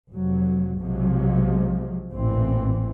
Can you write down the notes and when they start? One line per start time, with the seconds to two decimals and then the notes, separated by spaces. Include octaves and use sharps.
0.12 F1 F#3
0.80 B1 C3 F3 F#3 G#3
2.12 A1 D2 A#2 E3 C4